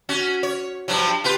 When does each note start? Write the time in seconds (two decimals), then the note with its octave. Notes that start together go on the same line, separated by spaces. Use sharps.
0.09 C#4 F#4
0.43 C#5
0.88 G2 F3 F#3
1.24 F4 G4 B4